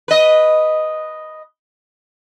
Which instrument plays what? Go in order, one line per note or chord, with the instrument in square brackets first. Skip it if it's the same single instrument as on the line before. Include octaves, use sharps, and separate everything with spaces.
[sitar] B4 D#5